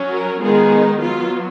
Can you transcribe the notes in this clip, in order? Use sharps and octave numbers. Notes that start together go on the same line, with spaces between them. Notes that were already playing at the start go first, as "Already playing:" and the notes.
Already playing: F#3 C#4
F#4 A#4
D#3 G#3 B3 F4 G#4
D#4
F#3 B3 F4